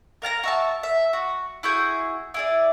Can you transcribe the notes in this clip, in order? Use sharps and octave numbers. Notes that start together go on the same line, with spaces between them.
A#4 F5 A5 A#5
F#4 E5 A5
E5
F#4
E4 F#4 G#4 G6
E4 G#4 D5